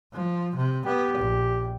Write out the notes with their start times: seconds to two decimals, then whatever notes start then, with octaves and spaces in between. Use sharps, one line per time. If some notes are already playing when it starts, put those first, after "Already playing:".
0.13 F3
0.56 C3
0.86 B3 G4
1.18 A#1